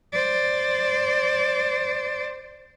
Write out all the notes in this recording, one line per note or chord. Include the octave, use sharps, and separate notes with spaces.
C5 D5